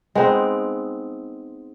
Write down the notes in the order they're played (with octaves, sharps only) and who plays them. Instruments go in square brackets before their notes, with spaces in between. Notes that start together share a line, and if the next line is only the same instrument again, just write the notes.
[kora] G#3 B3 C4 D#4